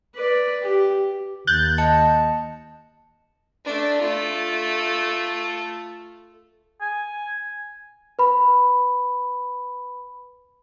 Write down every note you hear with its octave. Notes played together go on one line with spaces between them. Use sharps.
B4 D5
G4
D#2 F#6 G6 A6
D#5 A5 C#7
A3 D4
A3 F4
G#5
B4 B5